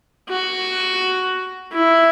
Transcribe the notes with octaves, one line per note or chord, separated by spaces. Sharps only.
F#4
E4